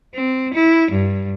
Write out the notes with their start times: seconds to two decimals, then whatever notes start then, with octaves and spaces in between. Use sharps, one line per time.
0.14 C4
0.54 E4
0.91 G2